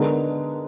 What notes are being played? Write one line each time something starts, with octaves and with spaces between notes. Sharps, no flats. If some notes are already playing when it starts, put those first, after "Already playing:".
Already playing: D3 G#3 B3 D#4 A#4